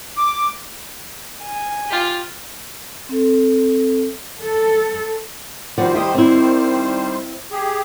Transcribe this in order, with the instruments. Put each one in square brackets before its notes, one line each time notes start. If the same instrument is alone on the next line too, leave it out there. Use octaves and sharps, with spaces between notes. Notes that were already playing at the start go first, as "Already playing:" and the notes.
[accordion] D6
[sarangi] G#5
[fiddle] F4 G4
[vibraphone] C4 A4
[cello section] A4
[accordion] D#3 G3 C5 [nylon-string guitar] F3 F#4 D5
[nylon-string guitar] E4 G4 D#5
C4 E4
[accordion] G4 G#4